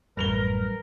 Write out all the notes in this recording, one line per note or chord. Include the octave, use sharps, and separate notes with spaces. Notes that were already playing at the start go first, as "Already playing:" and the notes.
A1 F#2 G3 A#4 B4 F7 G7